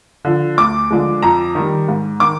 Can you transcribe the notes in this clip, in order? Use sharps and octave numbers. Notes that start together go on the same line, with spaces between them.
D3 F3
D2 D6
D3 F3 G#3
F2 A#5
D#3 G3
G#2
D#3 D6